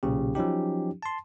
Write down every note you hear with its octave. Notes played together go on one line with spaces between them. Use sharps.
B1 A#2 C#3 G4
F3 F#3 C#4 D#4 G4
A5 C6